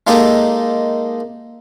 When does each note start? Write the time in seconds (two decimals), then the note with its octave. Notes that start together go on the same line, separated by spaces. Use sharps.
0.07 G#3 A#3 D#4 G4 A4